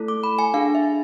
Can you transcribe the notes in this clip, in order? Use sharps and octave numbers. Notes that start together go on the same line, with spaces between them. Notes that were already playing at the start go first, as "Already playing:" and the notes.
Already playing: A3 E4 A4
D6
B5
G#5
D4 G#4 F5
E5